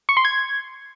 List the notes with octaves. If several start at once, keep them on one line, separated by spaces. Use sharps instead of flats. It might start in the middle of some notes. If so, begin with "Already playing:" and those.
C#6
C6
G#6